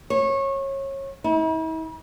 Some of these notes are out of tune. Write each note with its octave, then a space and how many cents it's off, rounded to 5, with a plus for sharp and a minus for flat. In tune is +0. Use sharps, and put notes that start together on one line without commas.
C#5 -25
E4 -45